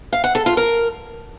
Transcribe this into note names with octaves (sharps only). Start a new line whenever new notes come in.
F5
F#5
A4
F4
A#4